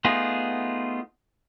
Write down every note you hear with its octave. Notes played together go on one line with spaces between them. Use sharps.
A3 B3 D#4 F4 G#4